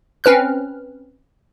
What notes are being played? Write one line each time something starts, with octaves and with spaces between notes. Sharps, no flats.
C4 C#4 B4 F6 F#6